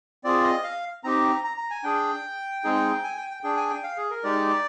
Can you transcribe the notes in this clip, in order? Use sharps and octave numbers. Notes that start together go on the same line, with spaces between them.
C4 F4 G#4 D5
D#5
F5
C4 D#4 G4 A#5
A#5
A#5
G#5
D4 G#4 G5
G#3 C4 D#4 G#4
G#5
G5
G5
D4 G#4 G5
G#5
G5
F5
G#4
A#4
G#3 D#4 G4 D5